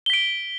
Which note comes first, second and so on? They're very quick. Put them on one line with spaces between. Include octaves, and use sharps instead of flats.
G7 B6 D7